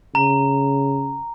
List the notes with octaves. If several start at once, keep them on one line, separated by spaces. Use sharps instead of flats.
C#3 A#5